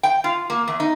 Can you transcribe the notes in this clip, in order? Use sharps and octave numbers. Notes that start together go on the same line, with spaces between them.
G5
F4
A#3
E2
D#4